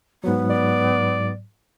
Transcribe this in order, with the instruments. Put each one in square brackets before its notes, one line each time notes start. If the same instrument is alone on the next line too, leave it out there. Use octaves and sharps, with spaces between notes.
[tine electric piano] G#2 F#3 [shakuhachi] B3
[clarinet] D5